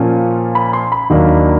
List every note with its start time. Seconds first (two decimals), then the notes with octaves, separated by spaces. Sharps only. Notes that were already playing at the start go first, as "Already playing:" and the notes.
Already playing: A#2 F3 A#3 C#4
0.55 B5
0.73 C6
0.92 B5
1.10 D#2 D#3 F#3 A#3 D4